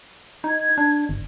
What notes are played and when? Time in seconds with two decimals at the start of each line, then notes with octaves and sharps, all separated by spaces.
0.44 D#4 G#6
0.78 D4
1.09 G1